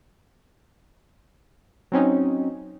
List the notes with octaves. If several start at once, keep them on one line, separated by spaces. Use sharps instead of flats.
F#3 C4 C#4 D#4